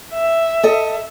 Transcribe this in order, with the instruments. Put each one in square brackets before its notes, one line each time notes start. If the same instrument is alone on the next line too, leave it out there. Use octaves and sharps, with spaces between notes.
[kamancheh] E5
[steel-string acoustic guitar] A4 D#5